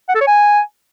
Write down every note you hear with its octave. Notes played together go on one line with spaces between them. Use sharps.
F#5
A4
C#5
G#5